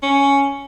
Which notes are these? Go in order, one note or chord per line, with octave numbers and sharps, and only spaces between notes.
C#4